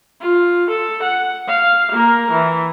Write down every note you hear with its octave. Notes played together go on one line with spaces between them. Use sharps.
F4
A4
F#5
F5
A#3 A#4
E3